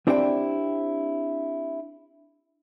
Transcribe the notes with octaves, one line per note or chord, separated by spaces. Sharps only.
C4 D4 E4 G4 C5 G5